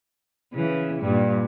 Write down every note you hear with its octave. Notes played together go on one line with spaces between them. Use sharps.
C#3 E3
G2 A#2 G3